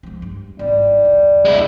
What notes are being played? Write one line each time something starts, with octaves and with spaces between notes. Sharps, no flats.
F3 G#3
G2
G#1 G3 E4
E2 D3
C#2 G#3 E4